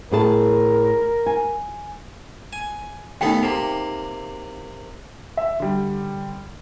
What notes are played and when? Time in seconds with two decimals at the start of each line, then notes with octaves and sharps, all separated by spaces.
0.11 A2 G#4 A#4 A5
1.26 G#5
2.53 G#5
3.21 D#2 A3 B3 D#4 G5
3.43 C3 A#3
5.37 E5
5.60 D3 G3